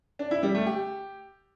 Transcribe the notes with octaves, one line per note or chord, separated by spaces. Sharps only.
D4
E4
G3
A3
G4